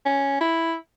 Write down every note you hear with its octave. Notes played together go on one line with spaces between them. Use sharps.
C#4
E4